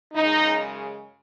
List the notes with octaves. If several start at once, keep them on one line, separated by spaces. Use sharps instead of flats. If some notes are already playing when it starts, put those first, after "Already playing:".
F#2 C#3 G#3 D#4